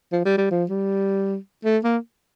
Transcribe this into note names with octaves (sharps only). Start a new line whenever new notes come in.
F3
G3
G3
F3
G3
A3
A#3